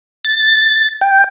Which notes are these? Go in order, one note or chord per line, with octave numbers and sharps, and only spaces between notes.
A6
G5